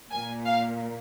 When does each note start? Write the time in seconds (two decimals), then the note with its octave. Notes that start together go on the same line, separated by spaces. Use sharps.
0.11 A#2 A#3 G#5
0.45 F5